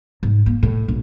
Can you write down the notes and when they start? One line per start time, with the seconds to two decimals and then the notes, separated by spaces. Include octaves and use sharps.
0.23 G#2
0.46 A#3
0.63 A2
0.88 A#1